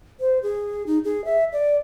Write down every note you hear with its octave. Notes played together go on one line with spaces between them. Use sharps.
C5
G#4
D#4
G#4
E5
D5